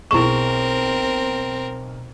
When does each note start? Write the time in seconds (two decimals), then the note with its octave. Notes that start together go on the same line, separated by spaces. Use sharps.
0.11 B1 C4 E4 G#4 A#4 C#6 E7